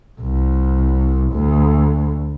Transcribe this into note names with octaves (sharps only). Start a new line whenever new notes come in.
C2
D2